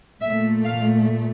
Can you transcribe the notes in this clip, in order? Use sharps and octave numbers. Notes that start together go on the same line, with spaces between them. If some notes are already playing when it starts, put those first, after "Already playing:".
A#2 A3 E5
F5